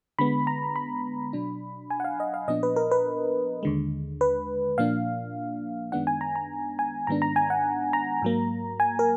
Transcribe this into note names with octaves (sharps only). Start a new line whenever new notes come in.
D3 G#3 B3 B5
A#5
B5
B2 F#3 D4
G#5
F#5
F5
D#5
F5
A#2 F3 B3 D4 D#5
B4
A#4
B4
D#2 D3 G#3
B4
A#2 F3 A#3 D4 F5
F#2 D#3 G#3 B3 D4 F#5
G#5
A#5
A#5
G#5
G#2 D#3 G#3 B3 D4 A#5
A#5
G#5
F#5
A#5
G#2 F#3 A#3
G#5
A#4